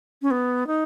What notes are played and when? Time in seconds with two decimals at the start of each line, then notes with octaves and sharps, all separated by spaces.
0.22 C#4
0.31 B3
0.67 D#4